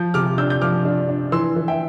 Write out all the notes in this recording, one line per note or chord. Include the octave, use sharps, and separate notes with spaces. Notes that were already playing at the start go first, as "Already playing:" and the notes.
Already playing: F3 G6
C3 D6 F6
D4 E6 G6
G6
F3 D6 F6
D4
D4
E3 C6 E6
E3
E5 G5